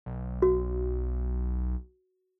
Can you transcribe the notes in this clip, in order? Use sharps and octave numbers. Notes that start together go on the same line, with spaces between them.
B1
F#4